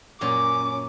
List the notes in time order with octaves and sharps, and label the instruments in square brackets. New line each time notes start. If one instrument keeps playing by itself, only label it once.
[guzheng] F#2 A#2 C#4 [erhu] D6